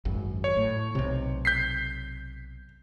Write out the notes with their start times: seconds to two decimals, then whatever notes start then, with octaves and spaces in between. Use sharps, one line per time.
0.05 G#1 F#2
0.44 C#5
0.57 A2
0.95 B1 C3
1.45 G6 B6 C7